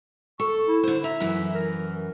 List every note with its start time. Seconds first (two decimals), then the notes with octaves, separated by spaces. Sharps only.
0.40 A4 C#6
0.68 E4
0.83 D3 C5
1.04 E5 A#5
1.20 F#2 E3
1.54 A#4